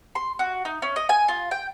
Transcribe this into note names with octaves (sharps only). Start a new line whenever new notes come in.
C6
F#4
D#4
C#4
D#5
G#5
F4
G5